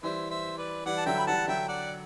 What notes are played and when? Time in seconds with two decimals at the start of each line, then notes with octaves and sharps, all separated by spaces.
0.03 E3 G3 C5 E5
0.31 C5 E5
0.58 B4 D5
0.86 E3 G3 D5 F#5
0.97 A5
1.06 D3 F#3 E5 G5
1.18 B5
1.27 E3 G3 F#5 A5
1.47 D3 F#3 E5 G5
1.68 D5 F#5